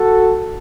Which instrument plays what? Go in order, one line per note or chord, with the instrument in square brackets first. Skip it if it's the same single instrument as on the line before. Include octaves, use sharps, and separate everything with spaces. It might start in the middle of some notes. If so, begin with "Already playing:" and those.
Already playing: [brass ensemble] F#4 A4